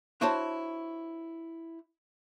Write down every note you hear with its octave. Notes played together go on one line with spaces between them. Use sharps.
D4 E4 F#4 C5 C#5 A5